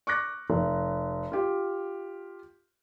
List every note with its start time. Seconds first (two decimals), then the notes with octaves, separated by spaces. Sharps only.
0.07 C#6 D6 F#6 A#6
0.50 F1
1.32 F4 G4